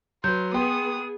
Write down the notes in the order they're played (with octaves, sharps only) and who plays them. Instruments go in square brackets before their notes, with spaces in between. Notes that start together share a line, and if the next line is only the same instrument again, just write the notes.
[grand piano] F#3 B4 [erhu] C6 [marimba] G6
[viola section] B3 G#4 [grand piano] G5 C6 [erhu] D#6